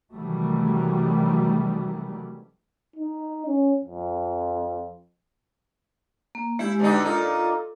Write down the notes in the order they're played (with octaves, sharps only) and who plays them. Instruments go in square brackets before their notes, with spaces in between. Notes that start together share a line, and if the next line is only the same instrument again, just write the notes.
[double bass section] C3 D#3 E3 F#3 G3 A3
[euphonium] D#4
C#4
F2
[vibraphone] A#3
[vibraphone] G#3 G4 G#5 [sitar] E4
[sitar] B2 D3 D#4
[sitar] A#2 D#4 [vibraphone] F4 A4